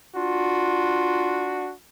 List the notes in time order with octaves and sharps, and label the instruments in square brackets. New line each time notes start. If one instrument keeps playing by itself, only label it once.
[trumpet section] D4 F#4 [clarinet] F4